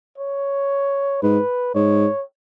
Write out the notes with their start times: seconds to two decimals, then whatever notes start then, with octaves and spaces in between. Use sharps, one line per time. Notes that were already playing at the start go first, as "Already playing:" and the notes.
0.18 C#5
1.22 G#2 B4
1.74 G#2 C#5